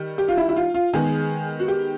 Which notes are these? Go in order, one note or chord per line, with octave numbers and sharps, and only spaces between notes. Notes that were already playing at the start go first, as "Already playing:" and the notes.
Already playing: D#3 G3
G4
F4
E4
E4
F4
F4
D#3 G#3 B3 G#4
F#4
G4